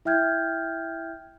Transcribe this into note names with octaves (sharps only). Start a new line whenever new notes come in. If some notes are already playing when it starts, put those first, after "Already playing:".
E4 E5 G5 F6 G6 G#6